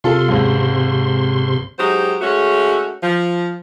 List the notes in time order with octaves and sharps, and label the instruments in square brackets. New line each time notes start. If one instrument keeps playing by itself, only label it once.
[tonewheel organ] C3 C6 [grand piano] F4 A4
[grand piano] G#1 C#2
[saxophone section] F#3 G#3 D#4 G4 C5
G#3 A3 C#4 F#4
F3